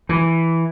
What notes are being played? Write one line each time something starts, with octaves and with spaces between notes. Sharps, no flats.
E3